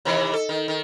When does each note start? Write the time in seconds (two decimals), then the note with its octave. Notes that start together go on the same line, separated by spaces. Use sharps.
0.05 C3 D#3 E3
0.33 A4
0.49 D#3
0.68 D#3